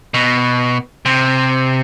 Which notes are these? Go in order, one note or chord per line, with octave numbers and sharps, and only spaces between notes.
B2
C3